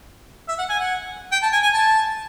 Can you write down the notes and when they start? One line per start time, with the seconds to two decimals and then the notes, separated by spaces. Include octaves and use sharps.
0.49 E5
0.58 F#5
0.70 G#5
0.79 F#5
1.32 G5
1.43 A5
1.53 G#5
1.63 G#5
1.74 A5